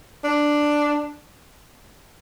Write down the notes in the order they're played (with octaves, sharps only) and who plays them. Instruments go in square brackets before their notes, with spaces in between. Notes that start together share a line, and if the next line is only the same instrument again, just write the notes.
[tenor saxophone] D4